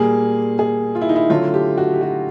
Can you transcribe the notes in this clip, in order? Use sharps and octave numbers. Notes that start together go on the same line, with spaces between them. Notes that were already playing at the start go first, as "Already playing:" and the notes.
Already playing: A#2 G3 A#3 G#4
G#4
F4
E4
D#4
E4
D3 F#3 A3 F4
G4
F#4
G4
F#4